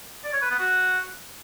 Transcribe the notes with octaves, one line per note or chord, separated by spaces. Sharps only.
D5
C#5
B4
B3
F#4